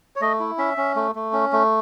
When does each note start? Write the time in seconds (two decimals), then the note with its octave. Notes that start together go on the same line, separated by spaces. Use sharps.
0.16 C#5
0.21 A3 D#5
0.40 E4
0.58 C#4 E5
0.77 C#4
0.96 A3
1.15 A3
1.33 C#4
1.52 A3